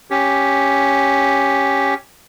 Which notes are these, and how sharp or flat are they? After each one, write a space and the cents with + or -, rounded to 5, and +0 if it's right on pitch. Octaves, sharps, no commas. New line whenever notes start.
C#4 +0 G4 +0